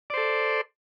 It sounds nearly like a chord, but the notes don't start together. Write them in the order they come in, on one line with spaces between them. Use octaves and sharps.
D5 C5 A4